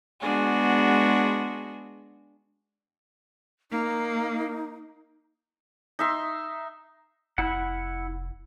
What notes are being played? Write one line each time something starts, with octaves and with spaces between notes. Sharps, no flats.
G#3 B3 D4 F#4 G#4
A#3 D#4
D#4 E5 C6
F1 E4 F#5